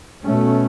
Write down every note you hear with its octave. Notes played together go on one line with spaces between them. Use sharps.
B2 A3 C#4